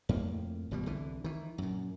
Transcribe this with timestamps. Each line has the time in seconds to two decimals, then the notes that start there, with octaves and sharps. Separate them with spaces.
0.09 F2 A2 A#3
0.71 G#1 B2 G3
0.86 C2 D3 E3
1.24 D#3 E3
1.58 F#2 A#2